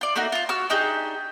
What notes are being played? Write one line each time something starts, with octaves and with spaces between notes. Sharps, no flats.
F4 D5
A3 A#3 D#4 F#4
F4 F5
F#4 E6 F6
D4 D#4 G4 G#4